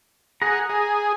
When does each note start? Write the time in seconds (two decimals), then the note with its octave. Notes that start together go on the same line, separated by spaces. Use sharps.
0.42 G#4 F#5 A#5
0.70 G#4